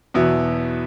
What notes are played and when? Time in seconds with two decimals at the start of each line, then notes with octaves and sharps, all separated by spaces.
0.14 E2 B2 F#3 B3 E4